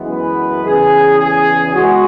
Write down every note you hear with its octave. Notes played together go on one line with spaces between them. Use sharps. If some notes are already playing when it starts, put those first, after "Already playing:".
Already playing: F#2 E3 G#3 B3
B4
E2 C#3 E3 G#4
G#4
G#3 B3 F#4